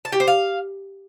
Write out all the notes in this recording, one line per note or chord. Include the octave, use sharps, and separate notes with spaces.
A5
G4
C5
F5